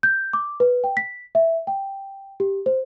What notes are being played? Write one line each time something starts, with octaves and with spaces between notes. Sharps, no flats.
G6
D6
B4
G5
B6
E5
G5
G4
C5